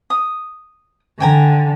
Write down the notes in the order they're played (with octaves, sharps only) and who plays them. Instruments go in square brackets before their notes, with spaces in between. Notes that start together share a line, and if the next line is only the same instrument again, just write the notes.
[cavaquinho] D#6
[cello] D3 [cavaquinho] G5 G#5 A#5